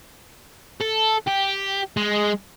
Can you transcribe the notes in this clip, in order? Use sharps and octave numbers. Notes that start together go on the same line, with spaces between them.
A4
G4
G#3